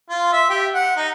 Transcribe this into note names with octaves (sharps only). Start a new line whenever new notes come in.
F4
E5
G4
F#5
D#4